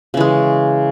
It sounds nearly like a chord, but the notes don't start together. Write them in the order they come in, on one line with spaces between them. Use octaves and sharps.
C#3 E3 G#3